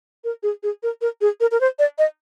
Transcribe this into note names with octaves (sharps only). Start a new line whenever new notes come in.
A#4
G#4
G#4
A#4
A#4
G#4
A#4
A#4
C5
D5
D#5